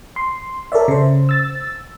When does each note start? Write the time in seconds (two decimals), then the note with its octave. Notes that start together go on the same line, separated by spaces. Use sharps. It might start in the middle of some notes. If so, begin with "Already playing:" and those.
0.16 C6
0.72 A4 A#4 C#5 D5 E5
0.88 C#3 C5
1.29 E6 A6